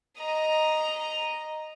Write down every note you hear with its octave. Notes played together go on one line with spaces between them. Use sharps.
D#5 A#5